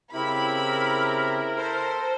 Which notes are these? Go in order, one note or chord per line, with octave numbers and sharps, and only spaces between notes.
C#3 C4 E4 G4 A#4 B5
A4 C5